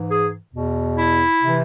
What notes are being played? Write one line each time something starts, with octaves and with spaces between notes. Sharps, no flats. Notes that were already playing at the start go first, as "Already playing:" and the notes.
Already playing: G#2 E3
G#4
E2 B2
E4
C3 E3